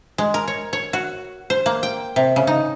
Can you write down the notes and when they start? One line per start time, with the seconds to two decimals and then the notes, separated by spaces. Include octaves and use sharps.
0.18 G#3
0.34 A#4
0.48 C#5
0.73 C#5
0.93 F#4
1.50 C5
1.66 A#3
1.83 G5
2.16 C3
2.36 C#3
2.47 D#4